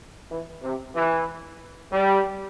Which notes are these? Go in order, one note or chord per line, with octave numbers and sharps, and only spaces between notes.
E3
C3
E3
G3